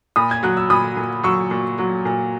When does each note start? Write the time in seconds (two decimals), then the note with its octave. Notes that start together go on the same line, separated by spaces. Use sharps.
0.16 A#2 B5 D#6
0.31 G#6
0.43 F#3 F#6
0.57 E6
0.70 A#2 B5 D#6
0.97 A#2
1.23 F#3 C#6 E6
1.51 A#2
1.78 F#3
2.05 A#2